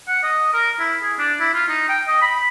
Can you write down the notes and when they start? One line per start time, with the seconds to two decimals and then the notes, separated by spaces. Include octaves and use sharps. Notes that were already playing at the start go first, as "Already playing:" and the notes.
0.08 F#5
0.23 D#5
0.53 A#4
0.79 E4
1.02 G#4
1.19 D4
1.40 E4
1.54 F4
1.68 D#4
1.89 G5
2.08 D#5
2.21 B5